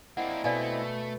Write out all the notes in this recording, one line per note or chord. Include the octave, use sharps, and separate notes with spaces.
A#3 C4 D4 E4 D#5 F#5
B2 A3 D5 F5 G#5